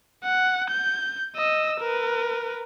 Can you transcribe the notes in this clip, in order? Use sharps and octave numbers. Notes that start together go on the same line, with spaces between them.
F#5
G6
D#5 E6
A#4 B4